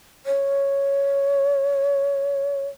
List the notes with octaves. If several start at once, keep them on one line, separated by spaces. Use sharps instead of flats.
C#5